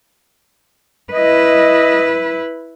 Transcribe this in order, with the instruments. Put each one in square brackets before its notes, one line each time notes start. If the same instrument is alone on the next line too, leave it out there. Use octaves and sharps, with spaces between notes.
[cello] E4 B4 [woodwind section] D#5